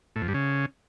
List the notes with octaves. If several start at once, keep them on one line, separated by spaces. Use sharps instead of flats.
A2
F2
G2
C#3